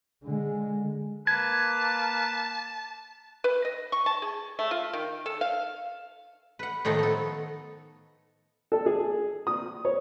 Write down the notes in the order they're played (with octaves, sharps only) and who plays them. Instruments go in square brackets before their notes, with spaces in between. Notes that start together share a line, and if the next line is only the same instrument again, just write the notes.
[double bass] D3 G#3
[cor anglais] A#3 [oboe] B4 [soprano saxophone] A5 [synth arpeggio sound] G#6
[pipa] B4
D#5
C#6
A5
G#4
A3
F4
D#3
A4
F5
[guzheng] B4 F#5
A2 D#3 F3 D#4 A4
B3 A4
[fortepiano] A4
G#4
D#6
C#5